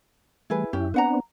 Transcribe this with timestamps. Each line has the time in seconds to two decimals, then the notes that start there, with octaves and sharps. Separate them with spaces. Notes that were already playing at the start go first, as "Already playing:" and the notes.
0.50 E3 G3 A3 E4 G#4 B4
0.73 F#2 C#4 E4 G4
0.94 B3 C4 D4 B4 F#5 A#5